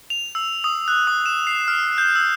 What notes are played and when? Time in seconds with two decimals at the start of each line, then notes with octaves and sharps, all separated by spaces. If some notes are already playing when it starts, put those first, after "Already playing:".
0.10 F7
0.35 E6
0.64 D#6
0.88 F#6
1.07 D#6
1.26 E7
1.47 C7
1.68 F6
1.98 G6
2.16 E6